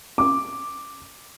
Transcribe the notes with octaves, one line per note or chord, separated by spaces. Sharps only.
D6